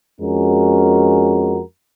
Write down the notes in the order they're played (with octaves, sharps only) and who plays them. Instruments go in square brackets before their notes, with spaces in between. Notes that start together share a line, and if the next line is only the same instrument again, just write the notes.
[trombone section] F2 G#3 C#4 F#4 A#4